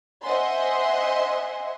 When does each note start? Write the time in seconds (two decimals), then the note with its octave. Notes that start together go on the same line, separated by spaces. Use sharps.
0.24 C5 D#5 E5 F#5 G#5 C6